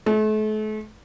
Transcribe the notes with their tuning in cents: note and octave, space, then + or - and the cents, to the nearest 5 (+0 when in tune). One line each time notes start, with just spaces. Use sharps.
A3 -40